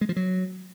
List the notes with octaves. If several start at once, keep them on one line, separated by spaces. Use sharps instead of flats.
G#3
F3
F#3